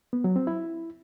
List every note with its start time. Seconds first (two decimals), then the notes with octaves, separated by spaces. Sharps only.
0.13 B3
0.24 F#3
0.36 C4
0.47 E4